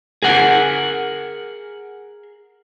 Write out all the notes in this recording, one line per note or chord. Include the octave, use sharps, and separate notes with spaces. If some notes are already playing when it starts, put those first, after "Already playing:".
G#4 A#4 F#5 G#5